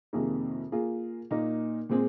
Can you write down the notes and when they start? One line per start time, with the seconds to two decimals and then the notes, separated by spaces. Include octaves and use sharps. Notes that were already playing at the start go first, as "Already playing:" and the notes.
0.13 F2 C3 D#3 A#3 G#4
0.72 A#3 F4 G#4
1.31 A#2 A#3 D#4
1.89 A#2 G#3 C4 G#4